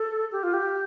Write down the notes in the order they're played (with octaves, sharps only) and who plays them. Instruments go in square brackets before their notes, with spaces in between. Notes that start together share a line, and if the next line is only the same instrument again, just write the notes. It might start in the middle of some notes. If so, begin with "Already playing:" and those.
Already playing: [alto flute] A4
G4
F4
G4